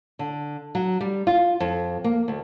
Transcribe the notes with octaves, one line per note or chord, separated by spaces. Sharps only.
D3
F#3
G3
F4
F2
A#3
D2